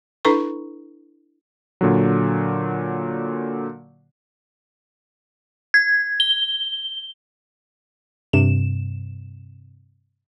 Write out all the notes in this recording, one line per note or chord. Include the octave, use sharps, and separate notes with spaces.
D4 E4 A4 B4 A#5 C#6
A#2 D3 F#3
G#6
G7
G2 C3 E7